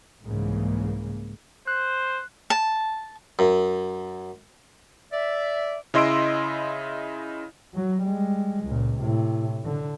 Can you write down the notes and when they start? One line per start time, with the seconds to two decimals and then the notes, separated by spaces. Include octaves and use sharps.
0.23 C2 G#2 C#3 E3 A#3
1.67 C5 F#6
2.50 A5
3.39 F#2
5.12 D5 E5
5.94 C#3 E4 D#5 C6 E6 D7
7.75 F#3
8.03 G3 G#3
8.66 C#2 A#2
9.01 A2 C3
9.65 D3